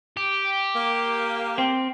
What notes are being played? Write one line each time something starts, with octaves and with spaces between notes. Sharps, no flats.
G4
A#3
C4